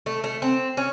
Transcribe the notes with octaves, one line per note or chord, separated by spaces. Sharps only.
A3
A3
C4
C#4